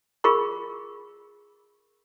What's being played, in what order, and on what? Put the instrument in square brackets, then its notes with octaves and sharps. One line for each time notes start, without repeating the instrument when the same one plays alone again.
[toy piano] F4 G#4 A#4 B5 C#6